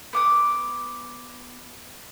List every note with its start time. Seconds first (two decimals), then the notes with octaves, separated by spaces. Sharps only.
0.13 B3 D6 D#6